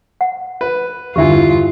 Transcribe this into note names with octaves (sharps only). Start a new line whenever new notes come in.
F#5
B4
E2 G2 D3 E4 F4 G4 E5 G#5